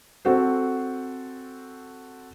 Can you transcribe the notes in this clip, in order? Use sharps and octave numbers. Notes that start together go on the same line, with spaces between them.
C4 F#4 A4 C5